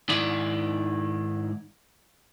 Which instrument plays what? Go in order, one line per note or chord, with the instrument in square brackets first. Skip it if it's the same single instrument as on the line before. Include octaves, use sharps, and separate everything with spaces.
[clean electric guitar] G#2 D#3 E4 D5